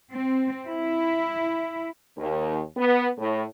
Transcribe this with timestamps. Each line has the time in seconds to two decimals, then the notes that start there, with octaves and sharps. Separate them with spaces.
0.12 C4
0.68 E4
2.18 D#2
2.77 B3
3.18 A2